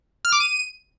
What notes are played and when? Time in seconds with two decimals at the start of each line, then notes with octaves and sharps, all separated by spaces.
0.25 F6
0.32 D6
0.40 D#7